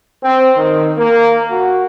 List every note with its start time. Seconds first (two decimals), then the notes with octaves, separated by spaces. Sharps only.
0.22 C4
0.56 D#3
0.98 A#3
1.51 F#4